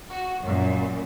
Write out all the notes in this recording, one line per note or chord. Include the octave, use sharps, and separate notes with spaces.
F#4
F#2 A#2